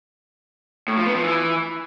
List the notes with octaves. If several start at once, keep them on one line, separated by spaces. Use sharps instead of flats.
A2
F3
B3
F3
E3